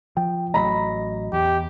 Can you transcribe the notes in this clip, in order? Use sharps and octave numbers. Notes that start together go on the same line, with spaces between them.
F3 G5
A1 A2 F#3 D#5 A#5 B5
E2 G4